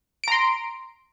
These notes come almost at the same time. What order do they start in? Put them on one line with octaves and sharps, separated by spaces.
D7 A#5 C6